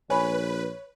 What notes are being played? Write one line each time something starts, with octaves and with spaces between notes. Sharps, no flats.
A#1 B4 C#5 G#5 B5